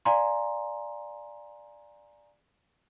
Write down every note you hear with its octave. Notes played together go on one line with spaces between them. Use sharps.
D5 F5 G#5 A#5 C6